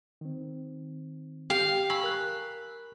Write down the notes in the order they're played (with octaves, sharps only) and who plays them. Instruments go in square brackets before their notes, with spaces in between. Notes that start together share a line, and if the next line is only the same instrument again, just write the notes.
[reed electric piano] D#3 C4
[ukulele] G4 [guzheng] F5
[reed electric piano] G#5 C#6 E6 [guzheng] B5
[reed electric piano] A#4 F#6